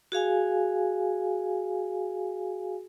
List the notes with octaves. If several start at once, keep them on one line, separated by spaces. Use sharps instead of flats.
F#4 G#4 F5 G#5